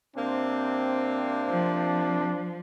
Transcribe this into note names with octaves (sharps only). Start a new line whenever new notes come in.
C3 A#3 C4 D4
F3